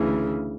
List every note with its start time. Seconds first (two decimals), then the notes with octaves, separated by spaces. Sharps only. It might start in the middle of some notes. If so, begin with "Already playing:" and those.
Already playing: D2 C#3 E3